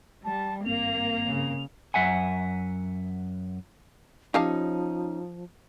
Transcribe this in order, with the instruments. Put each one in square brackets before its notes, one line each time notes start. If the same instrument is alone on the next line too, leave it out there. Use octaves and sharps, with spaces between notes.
[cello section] G3 [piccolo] A5
[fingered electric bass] G#1 G2 C4 [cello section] A#3 [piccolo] F7
[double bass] C#3
[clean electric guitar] F#2 E5 F#5 G#5
[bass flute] F3 [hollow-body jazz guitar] C#4 D#4 [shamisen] G4 F5 A5